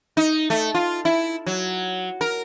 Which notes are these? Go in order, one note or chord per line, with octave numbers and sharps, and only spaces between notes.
D#4
A3
F4
E4
F#3
A#4